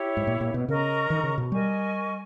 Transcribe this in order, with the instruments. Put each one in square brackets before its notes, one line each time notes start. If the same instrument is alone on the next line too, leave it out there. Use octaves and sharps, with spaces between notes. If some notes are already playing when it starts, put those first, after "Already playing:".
Already playing: [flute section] E4 G4 C#5
[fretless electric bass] G#2
A#2
A#2
B2
[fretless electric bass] C#3 [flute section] A#4 D#5 A#5 C#6
[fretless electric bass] D#3
C#3
B2
[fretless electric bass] G3 [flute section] A#4 D#5 G#5 C#6